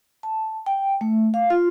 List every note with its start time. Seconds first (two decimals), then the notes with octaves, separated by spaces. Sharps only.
0.23 A5
0.66 G5
1.01 A3
1.34 F5
1.50 F4